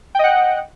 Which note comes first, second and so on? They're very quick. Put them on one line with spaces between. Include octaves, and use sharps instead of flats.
G5 D#5 F#5